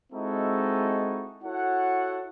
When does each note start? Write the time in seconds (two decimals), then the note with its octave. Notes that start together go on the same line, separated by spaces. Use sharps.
0.13 G#3 C4 D#4 E4 F#4 A4
1.44 E4 F#4 A4 C#5 F#5